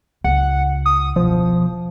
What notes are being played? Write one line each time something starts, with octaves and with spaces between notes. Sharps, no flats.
C#2 F#5
D#6
E1 F3